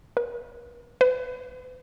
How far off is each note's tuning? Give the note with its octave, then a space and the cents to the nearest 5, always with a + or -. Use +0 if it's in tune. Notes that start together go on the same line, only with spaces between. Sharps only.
B4 -45
B4 +40